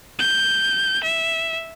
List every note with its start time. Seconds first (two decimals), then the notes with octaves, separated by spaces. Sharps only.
0.19 G6
1.03 E5